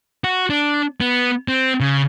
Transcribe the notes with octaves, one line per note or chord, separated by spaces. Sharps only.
F#4
D4
B3
C4
C#3